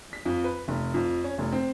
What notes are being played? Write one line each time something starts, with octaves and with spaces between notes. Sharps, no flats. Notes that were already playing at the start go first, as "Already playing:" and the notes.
B6
F2
B4
F1
F2
C#4
F1
C4